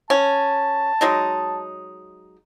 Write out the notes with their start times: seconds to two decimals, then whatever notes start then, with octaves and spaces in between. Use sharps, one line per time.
0.10 C#4 A5
1.01 F#3 G#3 D#4